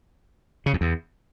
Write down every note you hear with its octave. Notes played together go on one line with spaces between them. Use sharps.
C#3
F2
E2